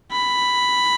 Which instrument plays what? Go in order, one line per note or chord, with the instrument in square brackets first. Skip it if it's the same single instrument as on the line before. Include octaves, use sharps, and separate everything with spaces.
[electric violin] B5